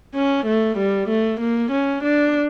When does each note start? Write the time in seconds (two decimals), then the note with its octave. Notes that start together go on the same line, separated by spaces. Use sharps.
0.15 C#4
0.46 A3
0.78 G3
1.09 A3
1.41 A#3
1.72 C#4
2.04 D4